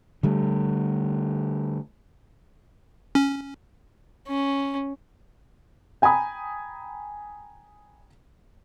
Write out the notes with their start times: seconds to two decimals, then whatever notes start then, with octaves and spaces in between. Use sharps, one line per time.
0.23 D3 G3 A3
3.15 C#4
4.28 C#4
6.02 G5 G#5 A#5 B5 D#6